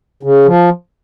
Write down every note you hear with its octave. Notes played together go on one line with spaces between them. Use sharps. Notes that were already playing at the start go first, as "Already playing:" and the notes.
C#3
F3